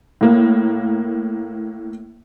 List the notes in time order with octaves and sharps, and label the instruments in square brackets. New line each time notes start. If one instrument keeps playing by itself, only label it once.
[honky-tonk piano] A2 A#3